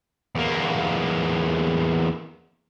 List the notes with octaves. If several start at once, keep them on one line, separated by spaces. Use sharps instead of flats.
E2 A#3